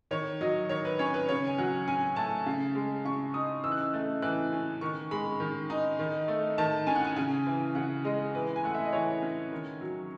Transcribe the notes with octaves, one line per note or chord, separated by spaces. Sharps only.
D#3 C#5
F#3 D#5
D#3 C#5
B4
C#4 C#5
B4
C#3 C#5
G#5
F#3 F#5
C#4 G#5
A3 A5
C#3
G#3
C#3 C#6
D#4 D#6
E3 E6
F#6
E6
A3
E3 F#6
C#4
D#3 C#6
G#3 B5
D#3
D#4
D#3
A3
D#3 A5
C#4 G#5
F#5
G#5
C#3 G#5
E3
C#3 F#5
G#3 D#5
E3 B4
G#5
A3 F#5
E5
D#5
E3 C#5
C#4
D#3
F#3